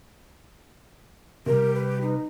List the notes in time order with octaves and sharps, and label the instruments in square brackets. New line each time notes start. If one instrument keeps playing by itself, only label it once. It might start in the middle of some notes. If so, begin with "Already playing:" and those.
[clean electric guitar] C3 G3 [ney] G4 [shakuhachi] A#4
[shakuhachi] B4
[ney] D#4